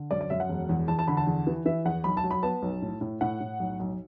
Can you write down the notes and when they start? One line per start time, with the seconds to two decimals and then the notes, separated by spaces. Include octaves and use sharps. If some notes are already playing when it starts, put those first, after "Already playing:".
Already playing: D3
0.11 F#2 D5
0.21 D5
0.30 F#2 E5
0.40 F#5
0.49 E1
0.69 E2
0.88 E2 A5
0.99 A5
1.07 D3 B5
1.17 A5
1.27 E2
1.47 E3
1.66 E3 E5
1.85 E2 F#5
2.04 B1 B5
2.17 A5
2.24 F#3
2.31 B5
2.43 B3 A5
2.62 B1
2.82 A2
3.01 A2
3.21 A2 F#5
3.40 A2
3.60 B1
3.80 B1